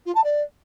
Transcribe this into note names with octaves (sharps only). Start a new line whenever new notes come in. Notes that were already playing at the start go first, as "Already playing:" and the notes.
F4
A5
D5